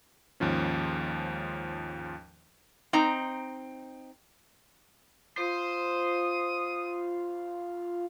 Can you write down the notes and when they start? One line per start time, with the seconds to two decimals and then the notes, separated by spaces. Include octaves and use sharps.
0.40 D#2 G#2 F3 C#4
2.93 C4 D#4 A#5
5.37 F4 C5 D#6